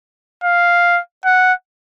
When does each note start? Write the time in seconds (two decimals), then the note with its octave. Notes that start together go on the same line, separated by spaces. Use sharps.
0.44 F5
1.25 F#5